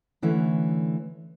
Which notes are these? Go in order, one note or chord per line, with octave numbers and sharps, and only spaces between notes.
D3 E3 A3 C#4